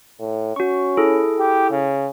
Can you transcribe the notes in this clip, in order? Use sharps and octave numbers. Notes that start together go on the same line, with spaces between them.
A2
C#4 F#4 C#6
E4 G#4 A4
G4
C#3